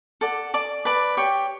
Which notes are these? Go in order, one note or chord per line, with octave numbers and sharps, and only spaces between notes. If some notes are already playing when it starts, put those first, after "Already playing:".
A4 D5 F#5
D5 A5 D6
B4 D5 A5
G4 C#5 G5